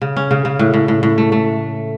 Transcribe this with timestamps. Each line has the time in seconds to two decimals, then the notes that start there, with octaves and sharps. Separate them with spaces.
0.02 C#3
0.16 C#4
0.31 C#3
0.45 C#3
0.59 A2
0.74 A2
0.88 A2
1.03 A2
1.18 A3
1.32 A3